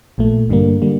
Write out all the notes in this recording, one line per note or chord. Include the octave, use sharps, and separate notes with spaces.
A#1 A#2 A3
G2 D3 G3 A#3
D3 G3 A#3